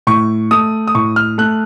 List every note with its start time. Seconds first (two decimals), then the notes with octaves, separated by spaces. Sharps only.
0.07 A2 C#6
0.51 A3 D#6
0.87 D#6
0.95 A2 C#6
1.16 F6
1.38 A3 F#6